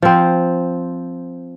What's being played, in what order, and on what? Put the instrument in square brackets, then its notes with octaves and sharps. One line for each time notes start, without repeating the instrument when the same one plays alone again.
[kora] F3 C4